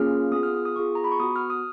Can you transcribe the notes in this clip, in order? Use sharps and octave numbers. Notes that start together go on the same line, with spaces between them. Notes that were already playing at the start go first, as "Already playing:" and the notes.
Already playing: A#3 C#4 F4 G#4 F6
B3 F4 G#4 D#6
F6
D#6
D#6
B3 F4 G#4 C#6
A#5
B5
C#6
B3 F#4 D#6
F6
D#6